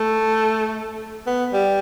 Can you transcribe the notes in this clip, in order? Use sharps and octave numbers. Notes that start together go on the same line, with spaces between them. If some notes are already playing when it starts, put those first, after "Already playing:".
Already playing: A3
B3
G3